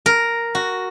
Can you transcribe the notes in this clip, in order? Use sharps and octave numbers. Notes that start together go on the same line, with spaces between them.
A#4
F#4